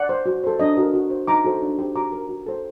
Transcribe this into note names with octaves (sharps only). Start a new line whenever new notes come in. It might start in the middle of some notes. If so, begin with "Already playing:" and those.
Already playing: D5 F#5
C5
F#4
A4 C5
D4 D#5
F#4 A#4
F#4
C5
D#4 A#5 D6
F#4 A4 C5
D4
G4 C5
F#4 A#5 D6
A#4
F#4
A4 C5